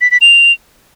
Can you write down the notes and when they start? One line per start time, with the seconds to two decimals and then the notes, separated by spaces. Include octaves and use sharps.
0.01 B6
0.11 B6
0.21 F7